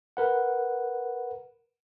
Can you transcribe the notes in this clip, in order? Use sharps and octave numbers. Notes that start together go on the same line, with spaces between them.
A#4 B4 F#5